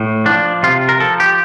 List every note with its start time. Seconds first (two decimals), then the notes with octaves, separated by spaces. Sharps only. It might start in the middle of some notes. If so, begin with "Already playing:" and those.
Already playing: A2
0.26 F3 D4
0.63 C3 F4
0.89 A#4
1.00 F3 A4
1.20 G4